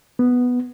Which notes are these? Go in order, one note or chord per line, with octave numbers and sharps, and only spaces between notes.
B3